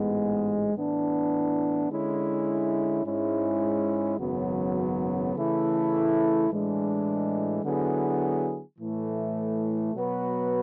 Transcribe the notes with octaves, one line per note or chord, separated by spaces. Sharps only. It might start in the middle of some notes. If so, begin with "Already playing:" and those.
Already playing: A1 G#2 G#3 B3
A2 E3 B3 D4
D3 G#3 C#4 E4
G#2 G#3 C#4 E4
G#1 F#2 C#3 F#3 B3
C#3 E3 A3 E4 A4
A2 E3 G#3 D4
D3 F#3 B3 E4 G#4
A2 E3 A3
B2 F#3 B3 F#4 B4